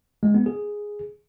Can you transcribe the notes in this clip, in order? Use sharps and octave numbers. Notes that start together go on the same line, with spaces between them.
G#3
B3
G#4